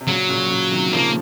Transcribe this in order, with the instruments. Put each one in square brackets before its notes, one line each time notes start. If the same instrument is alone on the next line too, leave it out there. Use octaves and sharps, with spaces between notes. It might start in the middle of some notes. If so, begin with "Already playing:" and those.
[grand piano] C3
[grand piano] A#2 C#3 [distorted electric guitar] F#3
[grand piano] A#2 C#3
A#2 C#3
C3 D#3
[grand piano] C#3 F3 [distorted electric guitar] A#3